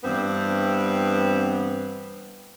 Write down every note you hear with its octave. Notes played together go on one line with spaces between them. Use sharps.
G2 E3 B3 C4